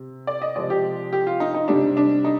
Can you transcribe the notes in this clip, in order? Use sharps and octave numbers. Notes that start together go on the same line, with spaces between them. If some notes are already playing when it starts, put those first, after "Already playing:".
Already playing: C3
D5
D#5
C3 F3 G#3 D5
G4
G4
F4
D#4
D#4
C3 G3 D4
D4
D#4